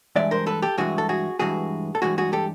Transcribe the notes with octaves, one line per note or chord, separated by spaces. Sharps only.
G2 E3 G#3 D5 E5
A#4 C5
A4 B4
G4 A4
G2 E3 G#3 F#4 G#4
A4
F#4 G#4
G2 E3 G#3 F#4 G#4
A4
G2 E3 G#3 F#4 G#4
F#4 G#4
G4 A4